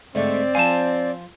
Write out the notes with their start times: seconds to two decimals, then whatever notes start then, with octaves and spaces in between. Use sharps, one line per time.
0.15 G#2 D3 A3 C4 D5
0.55 F3 C5 F5 G#5 A5